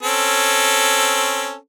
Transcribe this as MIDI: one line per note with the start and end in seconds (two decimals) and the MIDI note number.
0.03 1.56 60
0.03 1.56 61
0.03 1.56 69